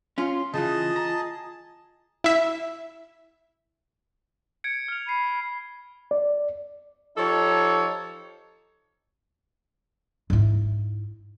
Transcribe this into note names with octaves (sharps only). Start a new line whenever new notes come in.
C#4 F4 C6
C#3 E3 F4 G#4 D#5 A5
A#5
E4 E5
G#6 C#7 D7
F6 F7
B5 C7 D#7
D5
F3 D#4 G4 A4 C#5
G#2 E4